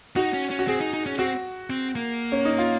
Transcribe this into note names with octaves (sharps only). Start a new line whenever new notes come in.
D#4 F#4
C#4
C#4
F#4
C4 G#4
D#4
D#4
C#4
C4 F#4
C4
A#3
C#4
D#4
F4